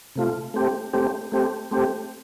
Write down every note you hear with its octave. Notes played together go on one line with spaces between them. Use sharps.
C3 A3 F4
A3 C4 G4
A3 C4 G4
A3 C4 G4
A3 C4 G4